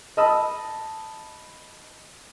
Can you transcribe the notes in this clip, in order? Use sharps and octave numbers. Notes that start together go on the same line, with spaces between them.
D#5 A5 B5 D#6 E6